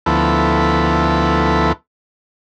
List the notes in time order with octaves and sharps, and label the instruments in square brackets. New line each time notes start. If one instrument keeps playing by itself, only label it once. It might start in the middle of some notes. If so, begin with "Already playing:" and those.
[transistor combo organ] D2 F3 B3 E4 A4